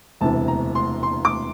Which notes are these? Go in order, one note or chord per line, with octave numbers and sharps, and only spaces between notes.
E1 D2 C3 E3 A5
A#5
C6
C6
D6